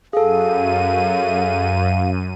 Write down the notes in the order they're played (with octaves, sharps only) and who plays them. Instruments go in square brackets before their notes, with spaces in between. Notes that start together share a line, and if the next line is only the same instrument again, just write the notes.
[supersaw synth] F#2 D#7 [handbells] G#4 A4 [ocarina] F5